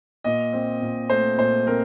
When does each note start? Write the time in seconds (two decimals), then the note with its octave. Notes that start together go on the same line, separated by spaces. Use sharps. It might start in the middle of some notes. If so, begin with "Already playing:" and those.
0.24 A#2 D#5
0.53 C4
0.82 A#2
1.10 A3 C5
1.38 A#2 C5
1.67 C4 A#4